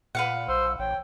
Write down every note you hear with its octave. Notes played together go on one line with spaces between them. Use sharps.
A#2 B4 F5 F#5
B1 C5 E6
A1 C#5 G5